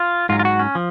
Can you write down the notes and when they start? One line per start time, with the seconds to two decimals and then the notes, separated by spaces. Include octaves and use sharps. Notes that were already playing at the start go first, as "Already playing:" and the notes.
Already playing: F4
0.29 G#2 F4
0.32 F#3
0.39 F4
0.45 F#4
0.59 C#4
0.75 F3